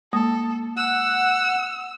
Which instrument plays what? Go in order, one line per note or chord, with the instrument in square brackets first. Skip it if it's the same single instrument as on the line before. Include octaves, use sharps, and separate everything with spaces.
[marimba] G#3 A#3 D#6 [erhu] A4
[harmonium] F#5 [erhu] E6